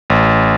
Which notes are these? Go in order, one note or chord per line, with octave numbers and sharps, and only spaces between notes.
A1